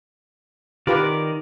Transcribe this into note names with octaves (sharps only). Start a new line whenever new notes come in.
D#3 F4 G4 A#4 B4 D5